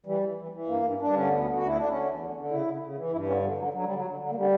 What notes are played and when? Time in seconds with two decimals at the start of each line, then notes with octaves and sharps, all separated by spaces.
0.06 E3 G3
0.22 E3
0.37 E3
0.52 E3
0.67 G2 A#3
0.83 G2
0.99 G2 D4
1.13 D3 C#4
1.29 D2 B3
1.44 D3
1.56 D2 F#4
1.66 E4
1.75 D3 D4
1.89 D3 C#4
2.05 E2
2.20 D3
2.35 D3
2.51 C#3 E4
2.66 C#3
2.82 C#3
2.97 E3
3.12 G2 E4
3.27 D3 C#4
3.43 D3 G3
3.58 D3 F#3
3.73 D3 F#3
3.84 G3
3.89 D3
3.94 F#3
4.05 D3
4.20 D3
4.31 A#3
4.35 D3 G3